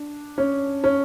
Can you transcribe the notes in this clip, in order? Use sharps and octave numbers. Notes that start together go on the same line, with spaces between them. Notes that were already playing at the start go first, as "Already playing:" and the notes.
Already playing: D4
C#4
C#4